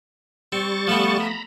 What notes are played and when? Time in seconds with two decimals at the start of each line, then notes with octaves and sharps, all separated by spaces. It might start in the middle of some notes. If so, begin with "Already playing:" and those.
0.52 G3 C4 C#6 A6
0.87 F3 A3 B3
1.20 A#5 B5